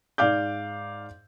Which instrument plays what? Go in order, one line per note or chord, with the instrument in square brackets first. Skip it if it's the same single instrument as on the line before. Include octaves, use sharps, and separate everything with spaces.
[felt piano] G#2 D5 F5 D6 G6